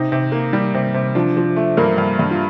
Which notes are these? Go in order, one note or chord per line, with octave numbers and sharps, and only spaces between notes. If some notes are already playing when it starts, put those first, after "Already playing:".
Already playing: C3 D#4
C3
A#3
G3
C3
C3
F3 D4
F3
A3
G2 A#3 A#4
G2
G2
F4